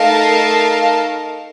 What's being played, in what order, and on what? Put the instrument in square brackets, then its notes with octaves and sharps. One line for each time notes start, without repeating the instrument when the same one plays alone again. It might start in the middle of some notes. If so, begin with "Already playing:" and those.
Already playing: [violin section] A3 D#4 A#4 F5 A5